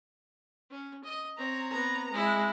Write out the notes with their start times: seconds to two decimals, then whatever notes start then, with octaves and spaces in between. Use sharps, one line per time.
0.71 C#4
1.04 D#5
1.37 C4 C#5 A#5
1.71 B3 A#5
2.14 G#3 E4